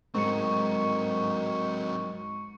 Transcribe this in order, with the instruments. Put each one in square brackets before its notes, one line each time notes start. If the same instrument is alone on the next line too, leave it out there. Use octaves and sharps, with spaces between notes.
[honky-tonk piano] G#2 [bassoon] D#3 [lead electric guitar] F#3 C4 [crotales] C#6 C#7